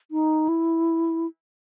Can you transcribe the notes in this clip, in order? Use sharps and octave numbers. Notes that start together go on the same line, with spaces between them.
D#4
E4